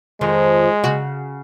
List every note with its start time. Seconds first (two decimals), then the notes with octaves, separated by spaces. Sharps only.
0.21 F2 D#3 F3 G#3
0.84 C#3 F#4